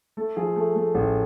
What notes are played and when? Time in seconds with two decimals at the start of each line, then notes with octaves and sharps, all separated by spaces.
0.17 A3 A4
0.37 F3 G#4
0.56 A3
0.75 A3
0.95 A1